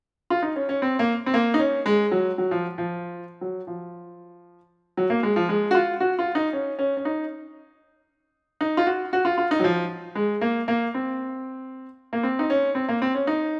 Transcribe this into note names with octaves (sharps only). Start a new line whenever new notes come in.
F4
D#4
C#4
C#4
C4
A#3
C4
A#3
D#4
C#4
G#3
F#3
F#3
F3
F3
F#3
F3
F#3
A#3
G#3
F3
G#3
F#4
F4
F#4
F4
D#4
C#4
C#4
C#4
D#4
D#4
F4
F#4
F#4
F4
F4
D#4
F#3
F3
G#3
A#3
A#3
C4
A#3
C4
D#4
C#4
C4
A#3
C4
C#4
D#4